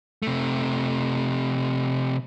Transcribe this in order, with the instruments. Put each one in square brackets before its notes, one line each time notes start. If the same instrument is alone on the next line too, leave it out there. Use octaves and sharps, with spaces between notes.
[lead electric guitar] C3 A3